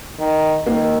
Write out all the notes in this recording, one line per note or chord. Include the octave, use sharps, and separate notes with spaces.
D#3
D#3 A#3